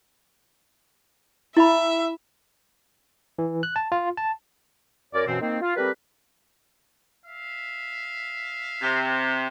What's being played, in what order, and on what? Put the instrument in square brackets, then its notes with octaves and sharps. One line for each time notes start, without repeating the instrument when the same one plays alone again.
[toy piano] E4 B5 [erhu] E5
[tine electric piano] E3
F#6
A5
F4
A5
[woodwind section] F#2 A#4 C#5 D5
F#2 B2 E3 C4
D#3 A#3 C4
F4
G3 A3 C4 G4 A#4 B4
[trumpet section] E5 F5
[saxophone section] C3